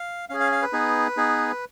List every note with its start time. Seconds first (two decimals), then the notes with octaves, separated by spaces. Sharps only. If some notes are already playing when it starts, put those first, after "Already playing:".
Already playing: F5
0.29 C#4 G#4 F5
0.40 F5
0.52 F5
0.62 B4
0.73 B3 D#4 G#4
1.17 B3 D#4 G#4